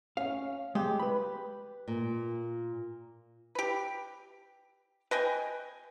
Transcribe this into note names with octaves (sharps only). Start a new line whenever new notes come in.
C#4 F5
G#3 G4
B4 B5
A#2
G4 B4
B4 D#5 G5 G#5